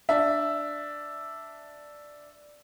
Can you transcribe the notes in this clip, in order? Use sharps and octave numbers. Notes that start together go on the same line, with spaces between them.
D4 E5